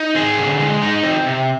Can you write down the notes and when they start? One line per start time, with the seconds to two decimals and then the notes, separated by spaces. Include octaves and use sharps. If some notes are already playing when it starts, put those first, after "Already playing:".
Already playing: D#4
0.15 C4 G#4
0.38 D3
0.60 G#3
0.82 D#4
1.03 C4
1.26 C3